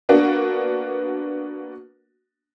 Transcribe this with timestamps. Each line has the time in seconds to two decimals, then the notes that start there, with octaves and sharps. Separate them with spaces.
0.09 A#3 B3 D4 F#4